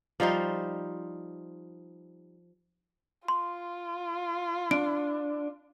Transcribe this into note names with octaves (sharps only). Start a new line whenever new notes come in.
F3 G3 D#4 C5
F4 C6
D4 D7